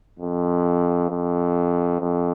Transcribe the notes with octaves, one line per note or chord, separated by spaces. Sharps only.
F2
F2
F2